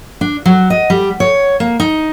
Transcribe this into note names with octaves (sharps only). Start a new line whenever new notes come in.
D4
F#3
D#5
G3
C#5
A#3
D#4